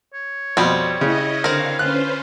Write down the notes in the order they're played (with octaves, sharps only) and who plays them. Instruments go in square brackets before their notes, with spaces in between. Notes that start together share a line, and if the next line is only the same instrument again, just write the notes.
[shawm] C#5
[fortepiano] F2 B2 [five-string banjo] G3 C4
[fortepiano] C#3 [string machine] E4 D#5
[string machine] D3 F5 [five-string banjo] C4 A#4
[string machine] C#4 B4 C5 [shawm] F4 [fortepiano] F#6